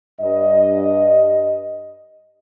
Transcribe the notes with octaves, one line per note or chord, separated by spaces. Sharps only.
G2 D#5